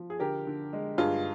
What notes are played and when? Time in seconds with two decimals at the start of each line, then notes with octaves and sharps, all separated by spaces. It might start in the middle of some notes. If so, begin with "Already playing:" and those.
Already playing: F3
0.10 G#4
0.20 D3 G4 A#4
0.47 D3
0.73 G#3
0.98 G2 F4 G#4